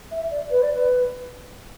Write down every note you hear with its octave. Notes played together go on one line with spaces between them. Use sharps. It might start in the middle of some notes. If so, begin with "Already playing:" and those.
E5
D5
B4
D5
B4